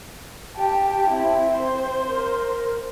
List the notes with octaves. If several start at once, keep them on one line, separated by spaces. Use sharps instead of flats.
G4 G5 A5
C4 E4
C5
A#4